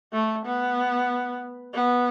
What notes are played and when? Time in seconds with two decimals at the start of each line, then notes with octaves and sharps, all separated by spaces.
0.12 A3
0.45 B3
1.73 B3